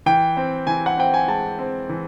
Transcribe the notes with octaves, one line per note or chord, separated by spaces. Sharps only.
E3 G5
C4
E3 G#5
F#5
C4 G5
G#5
G#3 A5
C4
E3